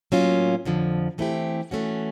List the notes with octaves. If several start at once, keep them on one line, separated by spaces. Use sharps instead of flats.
A2 F#3 A#3 C#4 F4
F2 D3 F3
E3 A3 C4 E4 G4
E3 A3 C#4 F#4